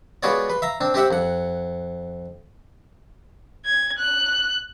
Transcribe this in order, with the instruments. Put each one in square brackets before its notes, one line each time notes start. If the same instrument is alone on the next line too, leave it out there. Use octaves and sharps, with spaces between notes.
[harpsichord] G#3 B3 F4 F#4 C#5 D5
B4 C6
E5 F5 A#5
C4 D4
C4 G4 C5 E5 F#5
F2 F#5
[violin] G#6
F#6